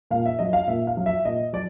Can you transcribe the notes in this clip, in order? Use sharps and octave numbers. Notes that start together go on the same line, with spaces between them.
A#2 F5
E5
F#3 D#5
F5
A#2 E5
F5
F#3
E5
A#2 D#5
F#3 D5